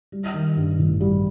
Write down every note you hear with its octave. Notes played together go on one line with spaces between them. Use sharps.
G3
D#3
G2
A1
G3